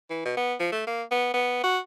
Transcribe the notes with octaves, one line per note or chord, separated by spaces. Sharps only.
E3
B2
B3
F3
A3
A#3
B3
B3
F#4